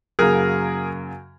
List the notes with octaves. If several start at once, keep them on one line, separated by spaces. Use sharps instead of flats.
F#2 C#3 F#3 A#3 G#4 A#4